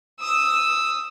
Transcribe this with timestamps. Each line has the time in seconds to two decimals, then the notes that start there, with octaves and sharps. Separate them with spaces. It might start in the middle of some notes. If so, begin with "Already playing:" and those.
0.20 D#6 E6